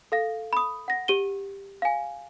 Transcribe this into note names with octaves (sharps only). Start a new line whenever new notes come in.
A4 F5 A#6
B5 D#6
F#5 A#6
G4 D#7 G7
F5 G#5